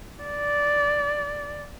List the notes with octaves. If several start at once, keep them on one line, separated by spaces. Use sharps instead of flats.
D5